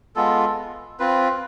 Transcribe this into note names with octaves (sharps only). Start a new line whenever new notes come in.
G#3 B3 F4 A4
C4 F4 B4